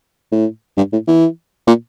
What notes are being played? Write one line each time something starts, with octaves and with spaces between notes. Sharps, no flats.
A2
G2
A2
E3
A#2